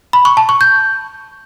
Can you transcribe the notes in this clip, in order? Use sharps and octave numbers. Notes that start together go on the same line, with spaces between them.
B5
C#6
A5
C#6
G6